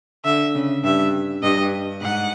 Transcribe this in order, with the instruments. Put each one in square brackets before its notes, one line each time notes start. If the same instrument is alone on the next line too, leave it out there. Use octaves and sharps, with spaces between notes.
[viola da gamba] D3 [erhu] E5
[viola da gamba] C#3
[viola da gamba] G2 [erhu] E5
[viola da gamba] G2 [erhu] D#5
[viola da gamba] G#2 [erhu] F#5